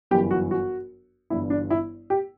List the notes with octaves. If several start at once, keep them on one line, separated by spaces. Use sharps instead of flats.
G1 F#2 E3 G4
F#4
F#4
G1 G2 E3 E4
D4
E4
G4